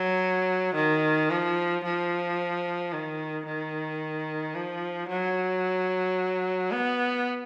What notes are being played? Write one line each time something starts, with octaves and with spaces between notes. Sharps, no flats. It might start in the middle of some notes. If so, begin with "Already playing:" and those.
Already playing: F#3
D#3
F3
F3
D#3
D#3
F3
F#3
B3